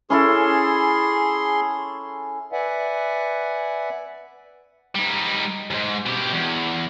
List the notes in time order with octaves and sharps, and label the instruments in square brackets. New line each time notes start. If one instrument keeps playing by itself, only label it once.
[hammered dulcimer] C#4 E4 A4 [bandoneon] G#4 C6
[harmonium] B4 D5 E5 F#5 G#5
[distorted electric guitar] G3 D#4
D#2 G#2
B2 G4
E2